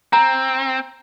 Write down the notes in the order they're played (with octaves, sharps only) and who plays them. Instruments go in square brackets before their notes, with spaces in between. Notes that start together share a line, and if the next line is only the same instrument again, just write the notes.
[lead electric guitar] C4 [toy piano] A#5